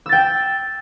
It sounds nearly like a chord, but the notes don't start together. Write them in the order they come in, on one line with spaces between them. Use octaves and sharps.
E6 A6 G5